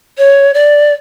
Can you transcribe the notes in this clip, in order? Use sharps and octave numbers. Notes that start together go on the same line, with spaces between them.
C#5
D5